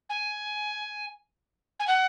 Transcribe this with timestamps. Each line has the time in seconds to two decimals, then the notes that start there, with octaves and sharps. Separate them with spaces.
0.10 G#5
1.80 G#5
1.87 F#5